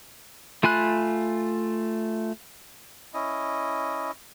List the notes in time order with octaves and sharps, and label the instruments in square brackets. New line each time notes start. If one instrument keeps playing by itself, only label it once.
[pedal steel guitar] A3 F4 G#5 B5 F#6
[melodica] C#4 E4 D#5